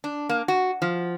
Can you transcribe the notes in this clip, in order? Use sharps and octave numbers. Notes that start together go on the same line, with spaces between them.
D4
A#3
F#4
F3